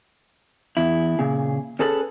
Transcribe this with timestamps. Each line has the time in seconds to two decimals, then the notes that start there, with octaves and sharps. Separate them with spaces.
0.77 E2 E4
1.19 A#2 C#3 G#4
1.79 C#4 G#4 A4 B4